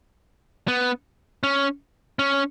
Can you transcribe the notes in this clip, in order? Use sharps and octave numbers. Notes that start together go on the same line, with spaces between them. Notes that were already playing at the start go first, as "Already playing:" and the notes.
B3
C#4
C#4